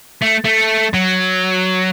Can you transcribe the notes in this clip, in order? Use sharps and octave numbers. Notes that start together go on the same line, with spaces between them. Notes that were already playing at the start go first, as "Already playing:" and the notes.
A3
A3
F#3